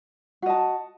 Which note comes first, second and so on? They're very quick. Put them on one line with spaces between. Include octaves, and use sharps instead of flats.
F#4 D#5 A5